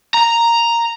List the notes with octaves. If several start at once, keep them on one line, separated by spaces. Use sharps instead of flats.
A#5